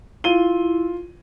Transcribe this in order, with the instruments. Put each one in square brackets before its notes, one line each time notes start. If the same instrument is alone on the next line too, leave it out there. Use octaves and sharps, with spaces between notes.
[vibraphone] E4 [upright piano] F4 D#7 G7